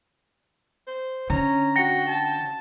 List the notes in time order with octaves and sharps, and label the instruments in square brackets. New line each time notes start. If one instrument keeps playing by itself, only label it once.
[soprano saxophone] C5
[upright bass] D3 [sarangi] C#4 [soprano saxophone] A#5
[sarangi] F#4 [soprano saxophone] G5 [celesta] A#6 C#7
[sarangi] A5